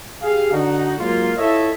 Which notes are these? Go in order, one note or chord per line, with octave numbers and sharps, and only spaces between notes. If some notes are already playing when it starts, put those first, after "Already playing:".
G4 G#4 F5
D3 D#4 F#4
G#2 F#3 A#3 F4
E4 F4 A4 C#5 D#5 E5